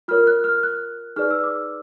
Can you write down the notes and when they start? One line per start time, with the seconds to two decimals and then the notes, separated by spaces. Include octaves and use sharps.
0.08 F4 A#4 C#5 F6
0.27 F#6
0.44 F6
0.63 F#6
1.16 D#4 G#4 B4 D5 F6
1.31 E6
1.43 D6